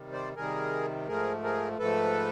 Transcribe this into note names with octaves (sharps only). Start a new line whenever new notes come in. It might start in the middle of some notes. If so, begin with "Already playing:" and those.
Already playing: C3 D#3 G3
C5 D5
C3 D#3 G3 G#4 A#4
G#2 F3 A3 G#4 A#4
G#4 A#4
G#2 F3 A3 A4 B4